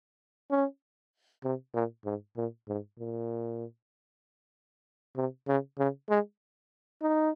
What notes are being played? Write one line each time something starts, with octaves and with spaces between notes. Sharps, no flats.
C#4
C3
A#2
G#2
A#2
G#2
A#2
C3
C#3
C#3
G#3
D#4